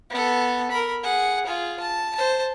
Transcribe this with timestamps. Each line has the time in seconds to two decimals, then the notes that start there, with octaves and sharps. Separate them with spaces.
0.10 B3 A4
0.71 A#4 B5
1.03 G#4 F#5
1.46 F4 G#4
1.80 A5
2.15 C5 A5